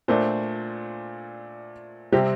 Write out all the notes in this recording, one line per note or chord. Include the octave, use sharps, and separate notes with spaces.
A#2 A3 D4 C5
C3 G3 C4 G4